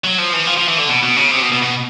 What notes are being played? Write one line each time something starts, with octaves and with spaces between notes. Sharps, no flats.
F#3
F3
E3
F3
F3
E3
D3
B2
B2
C#3
C3
B2
B2
B2